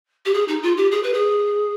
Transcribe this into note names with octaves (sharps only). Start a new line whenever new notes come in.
G4
G#4
D#4
F4
G4
G#4
B4
G#4